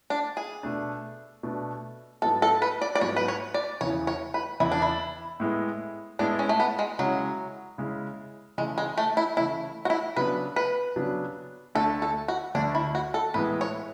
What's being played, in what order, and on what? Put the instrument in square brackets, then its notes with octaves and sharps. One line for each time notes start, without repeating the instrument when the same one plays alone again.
[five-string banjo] D4
G#4
[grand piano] B2 A3 D4
B2 A3 D4
[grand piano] G#2 F#3 B3 E4 [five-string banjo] A4
[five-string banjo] A4
B4
D5
D5
[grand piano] G#2 F#3 B3 E4 [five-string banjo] C#5
[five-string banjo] B4
C#5
D5
[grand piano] E2 C#3 E3 [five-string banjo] C#5
[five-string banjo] C#5
B4
[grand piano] E2 C#3 E3 [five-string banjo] E4
[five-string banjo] D4
E4
[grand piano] A2 G#3 B3 E4
[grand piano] A2 G#3 B3 E4 [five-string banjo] D4
[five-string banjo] C#4
A3
B3
G#3
[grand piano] C#3 G#3 C#4 E4 [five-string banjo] F#3
[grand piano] C#3 G#3 C#4 E4
[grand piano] C#3 E3 A3 [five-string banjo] G#3
[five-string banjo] G#3
A3
E4
[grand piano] C#3 E3 A3 [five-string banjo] E4
[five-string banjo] F#4
E4
[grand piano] C#3 F#3 B3 D4 [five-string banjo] B4
[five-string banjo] B4
[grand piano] C#3 F#3 B3 D4
[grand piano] D2 D3 A3 [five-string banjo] A4
[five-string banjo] A4
F#4
[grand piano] D2 D3 A3 [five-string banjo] D4
[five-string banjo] E4
F#4
A4
[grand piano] A2 E3 G#3 B3 [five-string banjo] B4
[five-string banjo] C#5